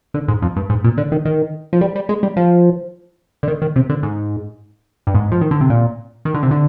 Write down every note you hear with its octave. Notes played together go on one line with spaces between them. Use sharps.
D3
G#2
F2
G2
G#2
A#2
D3
D#3
D#3
F3
G3
G3
G#3
G3
F3
D3
D#3
D#3
C3
D3
G#2
G2
G#2
F3
D#3
D3
C3
A#2
D#3
D3
C3
D3